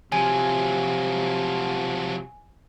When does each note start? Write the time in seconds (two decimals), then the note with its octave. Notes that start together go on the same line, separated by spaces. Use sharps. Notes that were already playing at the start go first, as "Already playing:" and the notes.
0.12 C3 F3 F#3 G#5